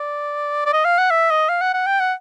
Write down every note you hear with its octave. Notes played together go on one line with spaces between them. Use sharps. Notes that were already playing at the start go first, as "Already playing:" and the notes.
Already playing: D5
D5
D#5
F5
F#5
E5
D#5
F5
F#5
F#5
G5
F#5